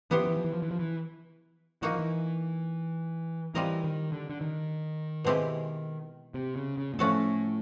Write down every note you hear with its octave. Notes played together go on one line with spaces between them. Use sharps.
E3 B3 E4 G4 C5
F3
E3
F3
E3
F3
E3
F3
E3
E3 A#3 D#4 F#4
F3
E3
E3 G3 C4 F4 A#4 D#5
D#3
D3
D3
D#3
B2 G#3 C4 E4 G4
C3
C#3
C#3
A#2
A2 F3 A3 C#4 F#4 A4